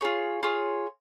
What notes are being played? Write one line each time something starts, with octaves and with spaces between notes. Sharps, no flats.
F4 G#4 C#5
F4 G#4 C#5